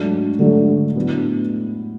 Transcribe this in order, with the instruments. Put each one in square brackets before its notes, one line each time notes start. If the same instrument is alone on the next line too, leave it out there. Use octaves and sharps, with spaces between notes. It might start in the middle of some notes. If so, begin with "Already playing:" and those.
Already playing: [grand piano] G#2 F#3 A3 D4 F#4
[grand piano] G#2 F#3 A3 D4 F#4 [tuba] D3
[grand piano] A2 F#3 B3 D4